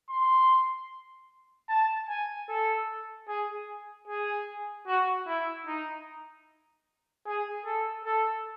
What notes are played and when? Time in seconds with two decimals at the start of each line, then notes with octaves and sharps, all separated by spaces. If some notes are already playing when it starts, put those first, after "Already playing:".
0.10 C6
1.69 A5
2.09 G#5
2.49 A4
3.28 G#4
4.08 G#4
4.87 F#4
5.27 E4
5.67 D#4
7.26 G#4
7.66 A4
8.06 A4